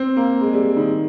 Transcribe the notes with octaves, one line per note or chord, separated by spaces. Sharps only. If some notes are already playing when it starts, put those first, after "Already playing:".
Already playing: C4
A#3
G#3
G3
G3
D#3